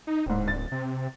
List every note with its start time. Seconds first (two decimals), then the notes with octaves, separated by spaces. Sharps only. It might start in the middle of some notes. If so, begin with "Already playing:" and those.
0.07 D#4
0.26 D1 G#2 C4
0.48 A6
0.72 C3